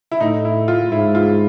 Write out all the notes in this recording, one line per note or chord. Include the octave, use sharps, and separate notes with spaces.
E4
A2 D#4
E4
F4
G#2 E4
F4